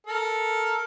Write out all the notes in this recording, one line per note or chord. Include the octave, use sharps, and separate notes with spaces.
A4 A#4